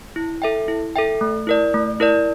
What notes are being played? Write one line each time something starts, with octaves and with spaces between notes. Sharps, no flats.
E4
A4 E5 G5
E4
A4 E5 G5
A3
E4 A#4 D5
A3
E4 A#4 D5